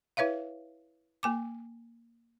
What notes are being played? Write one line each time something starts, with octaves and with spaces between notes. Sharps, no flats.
E4 B4 C#5 E5 F5
A#3 G#5 D6